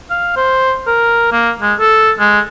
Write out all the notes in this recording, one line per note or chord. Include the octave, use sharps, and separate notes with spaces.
F5
C5
A#4
A#3
G#3
A4
G#3